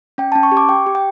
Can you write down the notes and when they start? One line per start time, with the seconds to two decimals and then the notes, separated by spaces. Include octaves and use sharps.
0.18 C#4 G5
0.32 C#4 A5
0.43 C#6
0.52 G4
0.57 D6
0.69 G4 G5
0.87 G4
0.95 G5